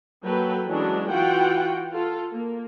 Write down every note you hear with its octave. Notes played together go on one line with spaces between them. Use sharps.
F#3 A#3 A4 B4 G5
E3 F#3 G#3 C#4 D4
E3 F4 F#4 F#5 G5
F4 A4
A#3